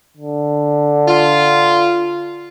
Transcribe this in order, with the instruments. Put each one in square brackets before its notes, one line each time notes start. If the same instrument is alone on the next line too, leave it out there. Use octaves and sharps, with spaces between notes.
[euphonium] D3
[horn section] F4